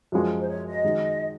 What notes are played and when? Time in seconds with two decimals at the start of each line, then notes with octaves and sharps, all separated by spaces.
0.12 F#2 F3 G#3 F#4
0.39 C5
0.48 C#5
0.66 D#5
0.84 D#3 G#3 D#4 F#4